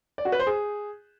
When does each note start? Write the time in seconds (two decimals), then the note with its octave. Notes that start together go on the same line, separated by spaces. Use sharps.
0.18 D5
0.25 F#4
0.32 B4
0.40 C5
0.47 G#4